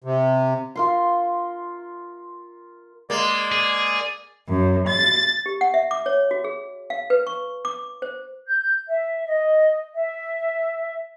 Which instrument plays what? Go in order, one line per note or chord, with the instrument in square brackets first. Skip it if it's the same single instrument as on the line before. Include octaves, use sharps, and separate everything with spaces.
[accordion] C3
[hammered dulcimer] F4 A#4 C6
[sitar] G#3 A#3 [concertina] D5
[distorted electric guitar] G#4
[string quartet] F#2
A6
[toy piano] G4
F#5
E5
D6
C#5
F#4
G#4
F5
B4
C#6
D6
C5
[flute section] G6
E5
D#5
E5